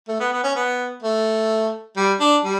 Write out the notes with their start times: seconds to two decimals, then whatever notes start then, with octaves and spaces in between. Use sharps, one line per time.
0.08 A3
0.20 B3
0.32 B3
0.44 C#4
0.55 B3
1.03 A3
1.96 G3
2.20 D4
2.44 G3